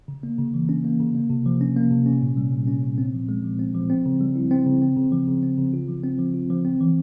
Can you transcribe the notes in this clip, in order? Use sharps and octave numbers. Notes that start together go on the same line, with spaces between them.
C#3
A#3
C#3
E3
C#4
A#3
C#3
A#3
C3
F3
C#4
A#3
C3
C#4
A#2
G3
A#2
C#4
A#2
C4
F3
G#3
F3
C4
F3
C4
C#3
G3
E4
C4
C#3
C4
C#3
F3
C#3
C4
C#3
F4
F3
C4
F3
F4
F3
C4
E3